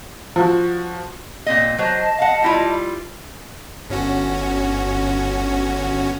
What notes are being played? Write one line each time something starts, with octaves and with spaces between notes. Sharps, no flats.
F3 F#4
A#2 C4 D#5
F#3 C5 D#5 A5
F5 F#5
G3 E4 F4
G1 C#4 F#4